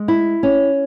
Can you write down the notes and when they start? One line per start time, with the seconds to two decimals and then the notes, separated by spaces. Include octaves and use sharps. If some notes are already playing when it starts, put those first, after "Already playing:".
Already playing: G#3
0.08 E4
0.43 C#4